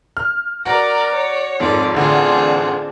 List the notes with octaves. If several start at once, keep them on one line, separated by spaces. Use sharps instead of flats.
F6
F#4 A#4 D5 A#5
C#5
F2 G#2 D#3 D5
A1 D3 C4 D4 F4 G#4